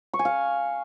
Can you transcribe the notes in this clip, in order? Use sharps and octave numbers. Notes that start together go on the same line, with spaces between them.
C#6
G#5
F5